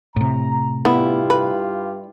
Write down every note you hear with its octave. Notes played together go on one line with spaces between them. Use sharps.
A2 C3 A#5
G2 G3 B3 E4 F4 G4
B4